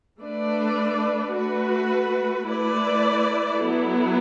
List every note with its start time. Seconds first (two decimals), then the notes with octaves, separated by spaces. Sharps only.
0.20 A3 D4 B4 D5
1.34 A3 F#4 B4
2.48 A3 E4 B4 D5
3.62 F#3 B3 E4 A4